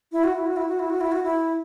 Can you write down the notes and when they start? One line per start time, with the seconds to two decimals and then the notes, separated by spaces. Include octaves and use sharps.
0.12 E4
0.24 F#4
0.35 E4
0.46 F#4
0.57 E4
0.68 F#4
0.79 E4
0.90 F#4
1.01 E4
1.12 F#4
1.24 E4